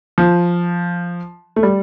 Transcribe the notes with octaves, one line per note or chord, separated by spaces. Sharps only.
F3
A3
G3